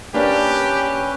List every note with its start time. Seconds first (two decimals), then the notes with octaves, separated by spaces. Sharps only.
0.14 A#3 C#4 D4 G4 B4 D5